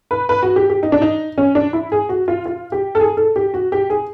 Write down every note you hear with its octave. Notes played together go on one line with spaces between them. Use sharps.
B4
B4
F#4
G4
G4
D#4
D4
D#4
C#4
D4
E4
G#4
F#4
F4
F4
G4
A4
G#4
A4
G4
F#4
G4
G#4